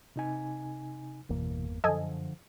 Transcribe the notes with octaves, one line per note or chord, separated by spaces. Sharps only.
C3 D#4 G#5
G1 E2 B2 E3 A#3
F#2 D3 F3 A4 D#5 G#5